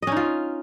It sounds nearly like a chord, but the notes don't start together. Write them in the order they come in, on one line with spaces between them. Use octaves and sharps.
D#5 C#4 D#4 F4